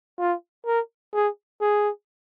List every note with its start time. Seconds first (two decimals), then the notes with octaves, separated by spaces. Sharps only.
0.19 F4
0.66 A#4
1.14 G#4
1.61 G#4